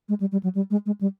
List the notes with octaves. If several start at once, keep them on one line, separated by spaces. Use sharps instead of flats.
G#3
G3
G3
F#3
G3
G#3
G#3
G3